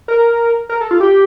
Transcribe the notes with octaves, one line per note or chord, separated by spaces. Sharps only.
A#4
A#4
A4
F4
G4